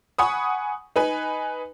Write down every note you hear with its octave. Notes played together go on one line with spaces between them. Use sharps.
F#5 G#5 B5 C#6 D#6
D#4 B4 G#5